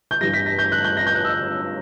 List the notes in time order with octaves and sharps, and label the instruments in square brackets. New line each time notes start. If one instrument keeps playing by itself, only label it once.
[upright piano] G6
G2 E3 G3 A#6
B6
A#6
G6
F#6
G6
A#6
G6
F#6
E6